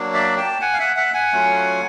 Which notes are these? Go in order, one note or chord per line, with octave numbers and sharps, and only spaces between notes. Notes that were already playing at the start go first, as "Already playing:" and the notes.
Already playing: F#3 A#3 D4
D5 E5
G5 A5
F#5 G#5
F5
E5 F#5
E5 F#5
F#5 G#5
F#3 A3 C#4 F4